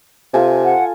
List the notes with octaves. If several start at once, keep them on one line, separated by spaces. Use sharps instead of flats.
C3 F4 A4 G#5
F#5